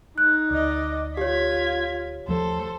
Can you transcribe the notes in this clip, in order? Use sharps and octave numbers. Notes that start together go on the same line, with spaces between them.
D#4 F#6
D2 D5 D#5
F4 G4 C#5 G#6 B6
D#2 F3 A3 A4 C5